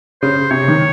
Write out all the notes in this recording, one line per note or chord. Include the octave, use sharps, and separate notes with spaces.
C#3 C5
C3 C#5
D#3